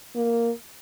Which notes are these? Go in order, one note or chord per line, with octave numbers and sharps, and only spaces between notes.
A#3